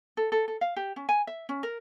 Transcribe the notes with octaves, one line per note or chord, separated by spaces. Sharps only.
A4
A4
A4
F5
G4
C#4
G#5
E5
C#4
A#4